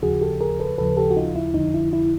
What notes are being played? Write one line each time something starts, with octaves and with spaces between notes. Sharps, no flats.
D#2 C#3 F3 F#4 G#4
G4 A4
G#4 A#4
A4 B4
D#2 C#3 F3 A4 B4
G4 A4
F#4
D#4 F4
E4
F2 D3 F3 D#4
E4
E4